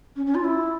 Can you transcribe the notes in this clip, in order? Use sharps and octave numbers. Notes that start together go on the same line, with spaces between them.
C#4
C#4
F4
E4